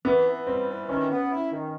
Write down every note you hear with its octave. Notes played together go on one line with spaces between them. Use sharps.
E3 B3
E3
G3 C4
E3
D#3 C#4
B3
E4
D#3